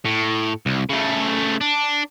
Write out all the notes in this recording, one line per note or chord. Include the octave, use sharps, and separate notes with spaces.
A2
C2
C#3 A3
D4